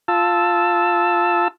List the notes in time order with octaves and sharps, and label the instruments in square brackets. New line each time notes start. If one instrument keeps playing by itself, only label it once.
[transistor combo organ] F4 A5 E6